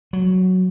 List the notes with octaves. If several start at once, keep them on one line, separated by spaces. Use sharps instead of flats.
F#3